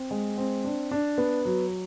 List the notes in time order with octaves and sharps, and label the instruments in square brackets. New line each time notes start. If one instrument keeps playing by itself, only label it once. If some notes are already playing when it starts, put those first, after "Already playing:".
Already playing: [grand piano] C4
G#3
C4
D4
D4
B3
F#3